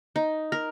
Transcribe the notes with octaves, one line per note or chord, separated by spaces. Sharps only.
D#4
A#4